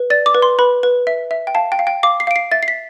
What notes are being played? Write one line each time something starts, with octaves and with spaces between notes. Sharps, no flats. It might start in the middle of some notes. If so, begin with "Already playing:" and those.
Already playing: B4
D5 A6
D6
B4
C6
B4 B5
B4
E5
E5
G5
F5 A5
G5
F5
G5
F5 D6
C7
F5 D7
C7
E5 A6
C7
B6